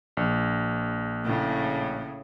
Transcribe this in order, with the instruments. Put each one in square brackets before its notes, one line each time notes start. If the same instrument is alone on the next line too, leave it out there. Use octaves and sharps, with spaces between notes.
[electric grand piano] A#1
[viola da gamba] A2 C#3